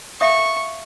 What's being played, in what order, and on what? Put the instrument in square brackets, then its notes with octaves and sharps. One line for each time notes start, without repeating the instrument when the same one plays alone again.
[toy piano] E5 F5 D#6 [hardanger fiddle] C#6